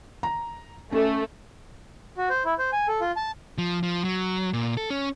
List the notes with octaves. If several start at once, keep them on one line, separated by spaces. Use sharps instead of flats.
A#5
A3 C#4
F#4
C5
E4
C5
G#5
A4
F4
A5
F3
F3
F#3
A#2
A4
C#4